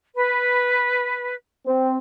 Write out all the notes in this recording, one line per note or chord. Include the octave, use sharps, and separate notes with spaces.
B4
C4